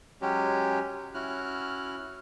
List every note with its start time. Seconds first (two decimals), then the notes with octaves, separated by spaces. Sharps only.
0.21 F#3 G#3 C#4 G4
1.14 C#4 E4 F#4 F6 F#6